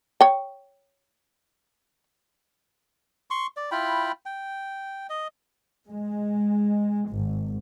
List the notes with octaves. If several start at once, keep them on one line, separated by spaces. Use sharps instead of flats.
C#5 G5
C6 C#6
D5
E4 F4 G5 B5
G5
D#5
G#3
G#1